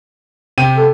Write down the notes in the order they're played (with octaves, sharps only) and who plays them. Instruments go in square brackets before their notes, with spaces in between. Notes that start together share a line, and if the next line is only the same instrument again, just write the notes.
[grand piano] C3 G5 D#7
[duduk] A4